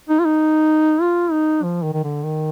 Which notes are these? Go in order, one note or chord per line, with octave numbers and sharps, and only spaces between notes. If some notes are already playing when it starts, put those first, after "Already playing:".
D#4
F4
D#4
F4
D#4
F3
D#3
D#3
D3
D#3